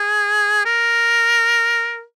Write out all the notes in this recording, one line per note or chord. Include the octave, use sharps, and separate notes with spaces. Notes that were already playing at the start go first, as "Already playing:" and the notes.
Already playing: G#4
A#4